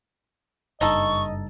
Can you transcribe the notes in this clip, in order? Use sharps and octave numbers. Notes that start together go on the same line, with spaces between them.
F#1 G2 D#4 A4 D#5 C#6